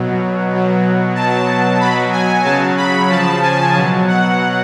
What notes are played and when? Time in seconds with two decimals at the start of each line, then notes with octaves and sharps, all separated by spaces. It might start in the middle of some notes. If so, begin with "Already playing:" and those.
Already playing: B2 F#3
0.50 B2 F#3
1.15 B2 F#3 A5
1.80 B2 F#3 B5
2.12 G#5
2.45 C#3 F#3 A5
2.77 B5
3.10 C#3 F3 A5
3.43 G#5
3.74 B2 F#3
4.08 F#5